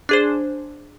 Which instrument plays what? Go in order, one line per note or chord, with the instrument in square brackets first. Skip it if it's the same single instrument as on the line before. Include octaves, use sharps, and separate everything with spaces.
[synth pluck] D4 G#4 C5